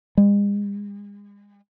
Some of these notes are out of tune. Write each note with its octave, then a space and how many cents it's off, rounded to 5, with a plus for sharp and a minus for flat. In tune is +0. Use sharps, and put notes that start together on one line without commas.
G#3 -40